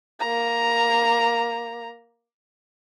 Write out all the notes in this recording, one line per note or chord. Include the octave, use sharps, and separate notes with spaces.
A#3 A#5